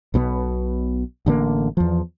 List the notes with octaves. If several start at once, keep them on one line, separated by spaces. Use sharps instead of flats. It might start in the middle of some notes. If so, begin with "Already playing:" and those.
B1 B2 F3 B3
A1 D3 D#3 A#3
E2 F3